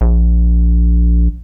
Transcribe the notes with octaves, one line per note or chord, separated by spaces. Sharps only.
A#1